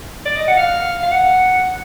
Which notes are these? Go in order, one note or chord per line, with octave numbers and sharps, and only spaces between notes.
D5
D#5
F#5
F5
F5
F#5